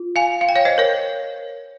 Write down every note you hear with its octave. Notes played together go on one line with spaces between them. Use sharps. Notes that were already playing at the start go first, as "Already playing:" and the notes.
Already playing: F4
F5 G#5
F5
G5
C#5 F5
C5 D#5
A#4 C#5